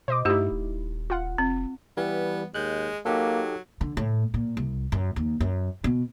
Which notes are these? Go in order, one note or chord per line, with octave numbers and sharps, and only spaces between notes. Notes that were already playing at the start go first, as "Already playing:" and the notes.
B2 C5 D#5 D6
G2 A3 D#4 E4 G4
D#1
F4 F#5
F1 C4
E3 G3 B3
D#2 G#3 F#6 G6
F#3 A#3 D#4 G4 A4
D3
A2
A#2
C2
F#2
D#2
F#2
B2